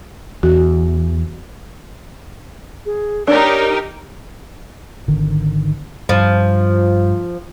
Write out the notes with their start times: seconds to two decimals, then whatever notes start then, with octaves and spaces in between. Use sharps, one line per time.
0.43 E2 F#4
2.86 G#4
3.27 D4 D#4 G4 A#4 C#5
5.08 G#1 D3 D#3
6.09 G2 F3